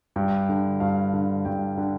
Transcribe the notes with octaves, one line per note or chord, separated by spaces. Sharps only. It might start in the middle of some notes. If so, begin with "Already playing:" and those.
G2 G5
D3
G2 F5
D3
G2 G5
D3